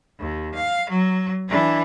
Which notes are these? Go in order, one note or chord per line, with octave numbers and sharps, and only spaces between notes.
D#2
F5
F#3
E3 D4